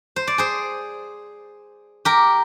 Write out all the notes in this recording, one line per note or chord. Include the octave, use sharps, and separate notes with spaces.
C5
D5
G#4 C5
G4 A#4